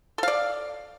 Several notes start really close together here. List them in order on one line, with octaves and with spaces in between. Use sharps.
A4 F5 D5